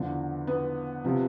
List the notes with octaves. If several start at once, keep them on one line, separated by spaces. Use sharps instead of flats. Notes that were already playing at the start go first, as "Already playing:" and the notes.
Already playing: E2 D3 F3
B3
C3 F3